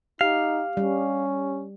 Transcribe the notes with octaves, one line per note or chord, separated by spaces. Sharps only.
D#4 G4 F5
G3 C#4